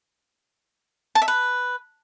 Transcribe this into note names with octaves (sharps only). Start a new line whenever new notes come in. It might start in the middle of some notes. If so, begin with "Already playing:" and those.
A5
E5
B4